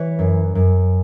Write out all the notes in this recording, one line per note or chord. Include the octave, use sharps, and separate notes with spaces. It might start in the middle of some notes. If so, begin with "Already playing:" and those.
Already playing: E3 C#5
F#2
F#2